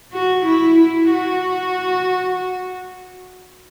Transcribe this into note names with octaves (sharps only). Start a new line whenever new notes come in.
F#4
E4
E4
F#4